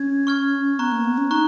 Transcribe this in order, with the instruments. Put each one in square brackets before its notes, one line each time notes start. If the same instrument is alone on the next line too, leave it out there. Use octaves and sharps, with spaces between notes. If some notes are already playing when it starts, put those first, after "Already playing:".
Already playing: [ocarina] C#4 [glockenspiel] G#6
[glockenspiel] C#6 F6 G#6
[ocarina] B3 [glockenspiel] A#5 C#6 F#6
[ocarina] A#3
B3
C#4
[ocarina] D#4 [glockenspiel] A#5 C#6 F#6